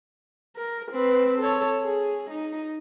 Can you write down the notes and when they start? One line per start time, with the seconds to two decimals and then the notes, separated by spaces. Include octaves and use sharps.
0.56 A#4
0.91 C4 B4
1.39 A4 C#5
1.83 G#4
2.30 D#4